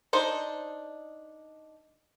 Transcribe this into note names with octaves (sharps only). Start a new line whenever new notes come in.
D4 D#4 C5